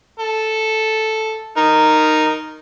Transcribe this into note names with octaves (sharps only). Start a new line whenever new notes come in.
A4
D#4 A#4